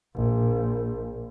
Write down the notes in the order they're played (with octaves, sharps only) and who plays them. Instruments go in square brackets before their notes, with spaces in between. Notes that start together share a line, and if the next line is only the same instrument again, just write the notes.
[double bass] A#1